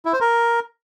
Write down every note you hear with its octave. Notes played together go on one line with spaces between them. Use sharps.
E4
C5
A#4